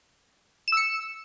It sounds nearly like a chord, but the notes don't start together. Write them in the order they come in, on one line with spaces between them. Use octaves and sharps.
E7 E6 C#7